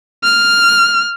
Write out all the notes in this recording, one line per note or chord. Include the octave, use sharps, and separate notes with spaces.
F6